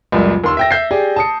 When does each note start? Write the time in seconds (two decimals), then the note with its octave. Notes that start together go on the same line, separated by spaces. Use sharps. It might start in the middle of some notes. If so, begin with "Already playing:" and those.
0.12 C#2 F#2 A#2 G3
0.44 D#2 C6 E6
0.57 E5 G5 A#6
0.71 E5 G6 C7
0.91 G4 G#4 D5
1.16 A5 D#6 C#7